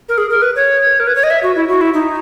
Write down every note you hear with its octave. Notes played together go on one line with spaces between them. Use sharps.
A#4
G#4
A#4
B4
C#5
A#4
B4
C#5
D#5
E5
F#4
E4
F#4
E4
D#4